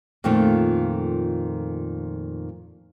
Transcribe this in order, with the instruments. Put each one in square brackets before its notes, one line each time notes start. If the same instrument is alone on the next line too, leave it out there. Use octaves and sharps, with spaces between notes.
[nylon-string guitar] F2 A#2 D#3 A3 F4